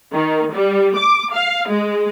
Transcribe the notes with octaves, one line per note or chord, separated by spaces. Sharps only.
D#3
G3
D6
F5
G#3